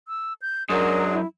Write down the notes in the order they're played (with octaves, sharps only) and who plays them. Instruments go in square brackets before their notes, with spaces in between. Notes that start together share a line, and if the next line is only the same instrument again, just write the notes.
[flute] E6
G6
[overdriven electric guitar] F#2 [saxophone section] F#3 G#3 D4 [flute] A#4
[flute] E4